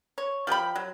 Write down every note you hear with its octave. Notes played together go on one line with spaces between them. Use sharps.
C#5
F3 G4 G5 B5
F#3